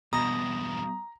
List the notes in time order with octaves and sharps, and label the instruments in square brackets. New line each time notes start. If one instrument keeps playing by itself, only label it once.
[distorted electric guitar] E2 G2 [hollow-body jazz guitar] B2 [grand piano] A#5 [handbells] D#6 A#6